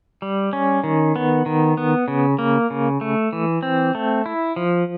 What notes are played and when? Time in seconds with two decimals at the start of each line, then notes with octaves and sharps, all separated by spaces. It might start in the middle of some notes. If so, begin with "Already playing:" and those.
0.22 G3
0.53 C#4
0.84 D#3
1.16 B3
1.46 D#3
1.77 B3
2.08 C#3
2.39 A#3
2.70 C#3
3.01 A3
3.33 E3
3.63 C4
3.95 A3
4.26 E4
4.56 F3